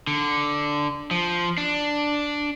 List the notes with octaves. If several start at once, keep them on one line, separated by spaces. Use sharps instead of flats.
D3
F3
D4